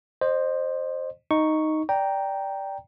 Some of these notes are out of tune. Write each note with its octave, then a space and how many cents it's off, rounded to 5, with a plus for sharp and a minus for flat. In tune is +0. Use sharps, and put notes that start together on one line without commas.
C5 +10 D#5 -30
D#4 +0 C#6 +0
D5 -5 G5 +0 A#5 +0